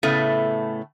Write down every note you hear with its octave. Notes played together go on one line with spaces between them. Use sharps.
A2 C#3 A3 B3